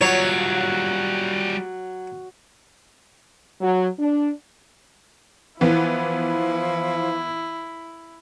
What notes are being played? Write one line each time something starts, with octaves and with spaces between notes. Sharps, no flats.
F#3 G3 F4 C#5
F#3
D4
E3 F3 B3 E4